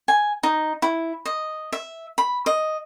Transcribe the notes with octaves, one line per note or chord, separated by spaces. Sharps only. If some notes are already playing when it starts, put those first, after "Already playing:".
G#5
D#4
E4
D#5
E5
B5
D#5